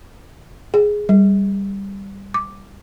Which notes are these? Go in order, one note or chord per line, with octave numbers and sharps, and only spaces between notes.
G#4
G3
D6